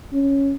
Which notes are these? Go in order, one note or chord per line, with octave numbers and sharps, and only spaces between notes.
C#4